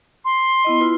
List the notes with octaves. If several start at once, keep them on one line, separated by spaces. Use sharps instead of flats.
C6
B3 E4 D#5
E4 F4 B4